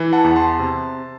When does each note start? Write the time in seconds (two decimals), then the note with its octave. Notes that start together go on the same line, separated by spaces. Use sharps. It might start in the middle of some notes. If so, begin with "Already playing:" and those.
Already playing: E3
0.13 F#5 A5
0.24 E2
0.36 A5 C6
0.59 C3